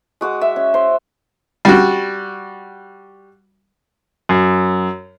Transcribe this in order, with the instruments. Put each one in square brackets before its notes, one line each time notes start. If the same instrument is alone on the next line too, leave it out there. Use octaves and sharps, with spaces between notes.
[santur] G#3 F#4 D6 D#6
E5
C#4
C5
[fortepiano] G3 F#4
[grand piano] F#2